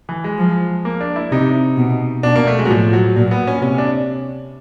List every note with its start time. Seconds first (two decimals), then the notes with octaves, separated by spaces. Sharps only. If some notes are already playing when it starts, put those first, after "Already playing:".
0.09 E3
0.24 G#3
0.39 F3
0.85 A#3
1.01 D4
1.16 E4
1.32 C3 D#4
1.77 B2
2.23 B2 D4
2.36 A#3
2.47 A3
2.59 G#3
2.65 F#3
2.69 A2 F3
2.93 F#3
3.16 A#2 F#3
3.31 B3
3.47 C#4
3.62 C3 C#4
3.78 D4